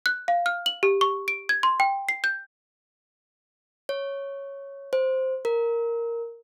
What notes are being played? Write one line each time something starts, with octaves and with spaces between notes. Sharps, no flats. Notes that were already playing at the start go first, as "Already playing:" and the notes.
F#6
F5
F6
F#7
G4
C#6
D7
G#6
C6
G5
C7
G6
C#5
C5
A#4